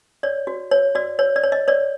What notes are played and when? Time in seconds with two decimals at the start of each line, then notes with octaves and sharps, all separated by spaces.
0.23 C#5 D5
0.47 F#4
0.71 C#5
0.95 F#4 D5
1.19 C#5
1.36 D5
1.43 C#5
1.52 D#5
1.68 C#5 D5